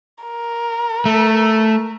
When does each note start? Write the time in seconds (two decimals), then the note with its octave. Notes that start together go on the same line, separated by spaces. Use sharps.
0.24 A#4
1.06 A3